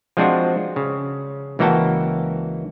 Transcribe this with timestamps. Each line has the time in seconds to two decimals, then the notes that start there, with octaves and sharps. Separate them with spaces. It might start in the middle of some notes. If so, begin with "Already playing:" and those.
0.17 F3 G#3 C4 D4 F4 F#4
0.76 C#3
1.59 C#2 E3 A#3 F#4 G5 A5